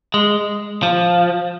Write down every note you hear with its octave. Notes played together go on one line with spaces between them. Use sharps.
G#3
F3